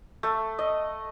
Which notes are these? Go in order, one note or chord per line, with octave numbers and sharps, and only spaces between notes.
A3
D#5